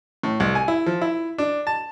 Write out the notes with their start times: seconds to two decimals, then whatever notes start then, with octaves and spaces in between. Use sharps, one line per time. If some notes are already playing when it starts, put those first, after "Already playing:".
0.23 A2
0.40 C2
0.55 G#5
0.68 E4
0.86 F3
1.02 E4
1.38 D4
1.67 A5